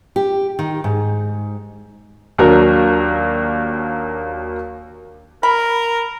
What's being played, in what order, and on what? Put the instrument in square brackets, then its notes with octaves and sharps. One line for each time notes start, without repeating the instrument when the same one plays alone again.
[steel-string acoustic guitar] G4
D#3
G#2
[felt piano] D#2 F#3 D4 F#4 A#4
[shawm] A#4 [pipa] B5